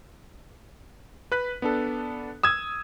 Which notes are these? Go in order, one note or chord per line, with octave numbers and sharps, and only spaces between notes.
B4 F#6 B6
B3 D4 A4
D#6 E6 G#6 E7